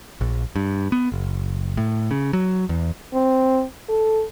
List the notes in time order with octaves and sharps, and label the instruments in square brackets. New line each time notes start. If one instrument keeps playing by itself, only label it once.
[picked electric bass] A#1
G2
B3
F#1
A2
C#3
F#3
E2
[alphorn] C4
A4